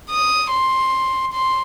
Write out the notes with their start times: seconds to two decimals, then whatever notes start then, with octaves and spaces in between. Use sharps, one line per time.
0.10 D#6
0.51 C6
1.33 C6